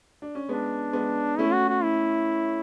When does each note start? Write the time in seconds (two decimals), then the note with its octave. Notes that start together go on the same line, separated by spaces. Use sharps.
0.22 D4
0.35 C#4
0.48 G#3 B3 D4
0.93 G#3 B3
1.39 A3 C#4 E4
1.53 F#4
1.69 F#4
1.83 E4